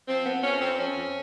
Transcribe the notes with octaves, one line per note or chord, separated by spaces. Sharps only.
F3 C4
F2 B3
F2 C#4
F2 C4
F2 C#4
F2